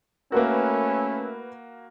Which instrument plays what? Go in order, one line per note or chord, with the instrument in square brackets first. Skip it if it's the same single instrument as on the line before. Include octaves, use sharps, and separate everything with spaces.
[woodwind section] A3 E4 [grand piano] A#3 F#4 [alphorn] C#4 [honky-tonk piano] A#4 B4